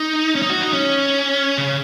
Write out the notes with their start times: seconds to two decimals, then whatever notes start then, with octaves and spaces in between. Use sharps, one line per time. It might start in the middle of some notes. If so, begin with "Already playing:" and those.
Already playing: D#4
0.35 C#4
0.42 D#4
0.50 F#4
0.61 D#4
0.73 C#4
1.58 C#3